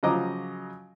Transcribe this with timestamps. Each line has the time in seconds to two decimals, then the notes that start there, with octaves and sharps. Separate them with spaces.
0.03 C#3 F3 F#3 D#5 A#5 D6